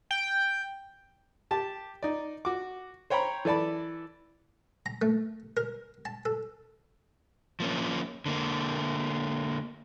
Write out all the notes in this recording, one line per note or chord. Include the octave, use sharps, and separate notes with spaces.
G5
G4 A5
D#4 D5
F#4 D6
C5 C#5 G5 A#5 B5
E3 A4 D5 A5 B5
A#5
A3
A#4
A5
A4
F3 A#3 C#4
D3 A#3